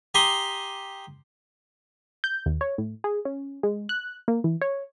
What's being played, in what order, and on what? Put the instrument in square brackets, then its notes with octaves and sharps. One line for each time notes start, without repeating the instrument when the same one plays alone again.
[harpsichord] G4 G#5 A#5 C6 D#6
[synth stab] G6
D#2
C#5
A2
G#4
C#4
G#3
F#6
A#3
E3
C#5